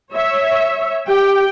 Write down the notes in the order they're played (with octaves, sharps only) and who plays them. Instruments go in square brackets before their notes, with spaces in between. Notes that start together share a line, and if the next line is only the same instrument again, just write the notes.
[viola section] C#5 E5
[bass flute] G4 [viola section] G5